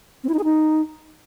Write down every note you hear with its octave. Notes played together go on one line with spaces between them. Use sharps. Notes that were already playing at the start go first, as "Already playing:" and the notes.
C4
E4
D#4
G#4
D#4